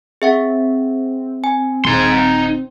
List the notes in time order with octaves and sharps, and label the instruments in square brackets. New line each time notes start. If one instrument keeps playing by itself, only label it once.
[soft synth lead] C4 [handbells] G#4 E5 F#5
[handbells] G#5
[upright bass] D#1 [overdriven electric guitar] D#4 C6